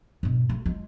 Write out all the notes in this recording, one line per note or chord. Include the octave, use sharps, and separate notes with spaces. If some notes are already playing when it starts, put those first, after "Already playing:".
G2 B2
A3
G#3 F4